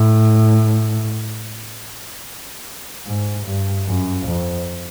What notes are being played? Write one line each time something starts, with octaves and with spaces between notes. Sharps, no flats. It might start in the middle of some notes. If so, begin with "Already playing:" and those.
Already playing: A2
G#2
G2
F#2
F2